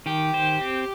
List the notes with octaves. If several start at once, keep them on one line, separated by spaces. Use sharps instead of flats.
D#3 G4
C5
C4